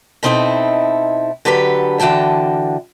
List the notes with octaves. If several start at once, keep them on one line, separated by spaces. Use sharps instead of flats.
B2 B3 C4 D#4 E4 A4
D3 F#3 G4 A4 B4
D3 E3 F#4 G5 A5